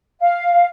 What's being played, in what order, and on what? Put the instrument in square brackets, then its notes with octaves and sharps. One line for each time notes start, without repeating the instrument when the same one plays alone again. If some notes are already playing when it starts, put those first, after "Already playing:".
[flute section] F5